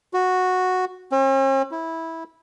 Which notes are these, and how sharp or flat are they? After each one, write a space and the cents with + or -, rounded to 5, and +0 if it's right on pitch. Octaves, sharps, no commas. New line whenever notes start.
F#4 -5
C#4 -45
E4 -15